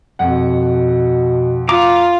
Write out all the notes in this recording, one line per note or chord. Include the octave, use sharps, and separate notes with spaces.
F2 B2 F#5
F4 A#5 D6